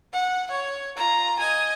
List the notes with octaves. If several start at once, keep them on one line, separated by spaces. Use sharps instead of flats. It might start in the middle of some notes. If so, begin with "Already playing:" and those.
F#5
C#5
F4 A#5
D#5 G#5